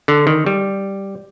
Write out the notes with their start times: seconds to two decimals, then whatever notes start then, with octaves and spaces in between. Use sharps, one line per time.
0.08 D3
0.27 D#3
0.46 G3